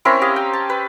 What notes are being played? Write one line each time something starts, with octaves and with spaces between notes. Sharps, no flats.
C4 C#4 E4 A#4
G4 D#5 F5
G5
A5
B4